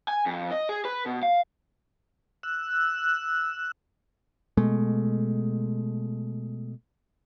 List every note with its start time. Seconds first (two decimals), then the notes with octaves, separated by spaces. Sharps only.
0.08 G#5
0.26 F2
0.52 D#5
0.69 G#4
0.85 B4
1.06 B2
1.23 F5
2.43 E6 F#6
4.57 B2 G#3 A3